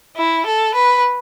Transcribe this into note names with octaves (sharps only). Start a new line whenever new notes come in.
E4
A4
B4